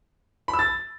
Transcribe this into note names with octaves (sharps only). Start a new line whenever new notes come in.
B5
E6
A6